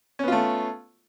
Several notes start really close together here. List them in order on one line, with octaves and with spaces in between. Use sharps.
C#4 B3 F4 A3